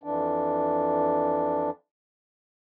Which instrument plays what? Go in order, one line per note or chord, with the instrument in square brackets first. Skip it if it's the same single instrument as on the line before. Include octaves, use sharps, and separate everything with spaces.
[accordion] F2 E3 D4